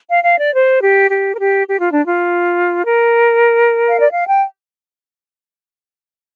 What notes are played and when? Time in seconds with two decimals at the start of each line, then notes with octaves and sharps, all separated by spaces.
0.09 F5
0.23 F5
0.38 D5
0.52 C5
0.80 G4
1.09 G4
1.33 A#4
1.38 G4
1.67 G4
1.79 F4
1.91 D4
2.03 F4
2.84 A#4
3.88 F5
3.98 D5
4.13 F5
4.27 G5